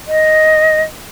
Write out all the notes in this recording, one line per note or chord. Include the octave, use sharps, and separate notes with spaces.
D#5